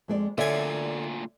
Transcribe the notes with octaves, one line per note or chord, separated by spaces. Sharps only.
F2 G#3 D5
D2 A#2 D3 C#5 D5 E5 G#5